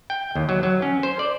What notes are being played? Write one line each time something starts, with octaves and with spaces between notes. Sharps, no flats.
G5
D#2
F#3
F#3
C#4
C5
D5